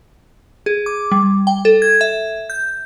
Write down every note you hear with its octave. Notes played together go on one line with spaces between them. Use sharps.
G#4
D6
G3
G5
A4
G#6
E5
G6